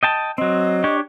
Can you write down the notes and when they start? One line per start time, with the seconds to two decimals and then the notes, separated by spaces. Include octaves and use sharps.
0.03 D#5 G5 A5
0.38 F#3 C4 D#5
0.84 D4 G4 C#5